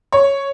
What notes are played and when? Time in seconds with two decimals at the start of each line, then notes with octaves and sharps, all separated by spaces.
0.12 C#5